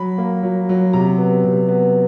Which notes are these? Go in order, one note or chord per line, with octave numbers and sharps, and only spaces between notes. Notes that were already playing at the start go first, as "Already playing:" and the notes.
Already playing: F#3 B5
A#3
F#3
F#3
C3 A#5
B3
C3
B3